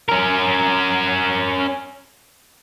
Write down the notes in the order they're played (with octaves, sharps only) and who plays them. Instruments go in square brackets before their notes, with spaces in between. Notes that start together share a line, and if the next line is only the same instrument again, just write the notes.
[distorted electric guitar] C#4 A#4